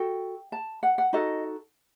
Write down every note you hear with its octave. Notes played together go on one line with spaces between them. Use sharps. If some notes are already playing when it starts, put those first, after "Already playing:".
Already playing: F#4 A4 G5
A5
F#5
F#5
D#4 F#4 A4 D#5